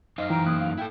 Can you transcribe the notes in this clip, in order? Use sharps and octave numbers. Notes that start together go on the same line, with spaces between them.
F#2 D#4 C5 D#5 F5 F6
E3 G5 A#5 F6 D7
A#3 D#6 F#6
F5
E4 A4 G5